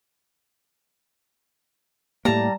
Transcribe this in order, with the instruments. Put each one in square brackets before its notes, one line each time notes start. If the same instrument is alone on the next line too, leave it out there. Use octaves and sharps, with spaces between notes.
[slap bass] A2 A#3 [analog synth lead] G3 [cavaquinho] A5 A#5